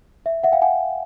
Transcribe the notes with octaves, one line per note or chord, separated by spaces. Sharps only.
E5
E5 F#5
F5 G5
F#5 G#5